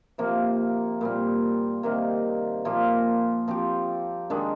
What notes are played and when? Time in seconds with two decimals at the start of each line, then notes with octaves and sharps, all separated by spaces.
0.18 C3 F3 A#3
1.01 A#2 G3 C4
1.83 C3 D#3 A#3
2.65 A#2 F3 A#3 F4
3.48 F3 C4 G4
4.30 D#3 G#3 D4